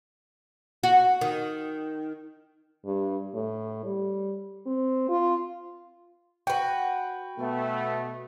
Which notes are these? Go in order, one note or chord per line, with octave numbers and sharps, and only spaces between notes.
F#4
D#3
G2
A2
G3
C4
F4
F#4 B4 G5
B2 A3 B3